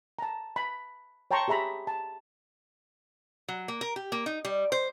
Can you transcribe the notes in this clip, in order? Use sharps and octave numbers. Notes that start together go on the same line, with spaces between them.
A5 A#5
B5
C#5 G5 A5 A#5 C6 C#6
G4 G#4 E5 A#5 B5
A5
F#3
A#3
A#4
G4
A#3
D#4
G3
C5